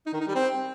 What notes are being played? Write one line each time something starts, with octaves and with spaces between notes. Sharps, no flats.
D#4
D#3
D#4
G3
C4